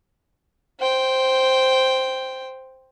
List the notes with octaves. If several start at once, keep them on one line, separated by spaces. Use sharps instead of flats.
C5 G5